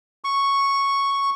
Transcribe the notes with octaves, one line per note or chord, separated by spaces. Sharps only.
C#6